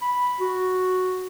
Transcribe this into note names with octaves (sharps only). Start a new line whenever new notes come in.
B5
F#4